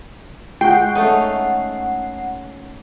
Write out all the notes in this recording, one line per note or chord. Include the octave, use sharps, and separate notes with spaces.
G#3 F#5 G5 C#6 C7
A3 C#4 D#4